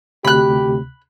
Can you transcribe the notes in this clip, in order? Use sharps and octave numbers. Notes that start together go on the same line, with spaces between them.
D2 C3 G4 B5 F#6